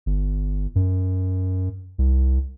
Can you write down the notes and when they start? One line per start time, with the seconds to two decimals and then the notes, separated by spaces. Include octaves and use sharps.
0.06 G1
0.75 F#2
1.98 C2